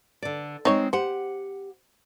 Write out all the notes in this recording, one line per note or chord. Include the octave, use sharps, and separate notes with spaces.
D3 D5
G#3 C4 D#4 C#5
G4 C5 F#5